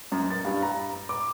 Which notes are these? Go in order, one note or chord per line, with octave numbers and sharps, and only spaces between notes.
F#2
A6
G2
A#5
D6